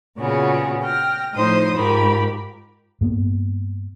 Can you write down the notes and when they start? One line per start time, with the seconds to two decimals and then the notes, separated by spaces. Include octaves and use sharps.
0.18 A#2 C#3 B3 F4 F#4 G#4
0.82 G5 F6 A#6
1.34 A2 F3 D#4 C5 C6 D#6
1.76 G#2 F4 G4 A#4 B5
3.01 G2 A#3 B3